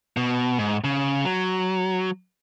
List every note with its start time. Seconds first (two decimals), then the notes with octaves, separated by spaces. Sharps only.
0.17 B2
0.59 G#2
0.84 C#3
1.25 F#3